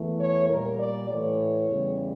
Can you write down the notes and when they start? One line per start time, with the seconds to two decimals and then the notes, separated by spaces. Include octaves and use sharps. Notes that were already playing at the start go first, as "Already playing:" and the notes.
Already playing: E2 E3 A3
0.19 C#5
0.49 A#2 G3 A#4
0.80 D5
1.09 A2 E3 A3 C#5
1.69 E2 C#3 G3